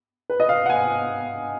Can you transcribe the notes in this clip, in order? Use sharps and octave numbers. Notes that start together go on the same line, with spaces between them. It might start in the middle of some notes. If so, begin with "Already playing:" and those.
B4
D#5
F5
F#5
G#5